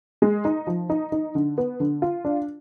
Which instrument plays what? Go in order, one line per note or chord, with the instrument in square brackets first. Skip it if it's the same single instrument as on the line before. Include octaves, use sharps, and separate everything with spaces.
[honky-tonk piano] G#3
D#4
F3
D#4
D#4
D3
B3
D3
F4
D4